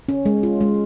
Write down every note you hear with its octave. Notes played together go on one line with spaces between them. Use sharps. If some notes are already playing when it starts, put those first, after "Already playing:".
C#4
G#3
F4
G#3